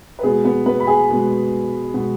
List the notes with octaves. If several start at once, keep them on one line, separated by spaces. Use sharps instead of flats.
B4
B2 G#3 B3 G#4
B3 B4
B3 B4
B5
G#4 G#5
B2 G#3 B3
B2 G#3 B3